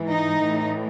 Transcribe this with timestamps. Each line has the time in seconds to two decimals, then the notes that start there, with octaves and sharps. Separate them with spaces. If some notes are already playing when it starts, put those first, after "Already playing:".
Already playing: G#2 E3
0.09 D#4
0.40 A2 E3